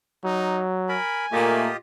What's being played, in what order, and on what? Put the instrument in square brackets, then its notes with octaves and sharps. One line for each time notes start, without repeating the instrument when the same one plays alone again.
[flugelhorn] F#3 [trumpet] D#4
[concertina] A#4 B5 [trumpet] G#5
[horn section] A#2 A3 [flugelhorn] A#3 [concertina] F4 G4 D#5